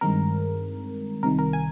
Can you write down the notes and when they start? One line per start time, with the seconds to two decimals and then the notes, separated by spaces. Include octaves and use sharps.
0.01 G2 D#3 G#3 C4 A#4
1.23 C2 C3 D#3 A#4
1.39 A#4
1.53 G#5